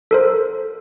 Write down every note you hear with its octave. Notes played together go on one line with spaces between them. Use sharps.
A4 A#4 C5